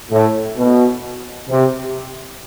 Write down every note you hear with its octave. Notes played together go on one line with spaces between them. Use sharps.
A2
B2
C3